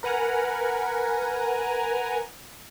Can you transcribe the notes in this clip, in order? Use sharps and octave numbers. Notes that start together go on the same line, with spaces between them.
A#4 B4 F#5 G#5 A#5